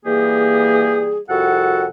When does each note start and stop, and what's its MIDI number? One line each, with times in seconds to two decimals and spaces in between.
0.05 1.19 52
0.05 1.19 55
0.05 1.19 58
0.05 1.19 67
0.05 1.19 68
1.30 1.86 36
1.30 1.86 41
1.30 1.86 66
1.30 1.86 69
1.30 1.86 78